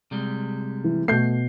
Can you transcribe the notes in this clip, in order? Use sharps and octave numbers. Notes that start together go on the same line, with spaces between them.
C3 G3 G#3
E3
B2 A3 G6 C7